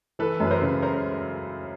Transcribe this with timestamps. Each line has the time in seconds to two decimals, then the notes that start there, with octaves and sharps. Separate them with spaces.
0.19 E3 A4 B4
0.40 F#2
0.47 B4
0.51 A#4 C5
0.62 C#3
0.82 A#4 C5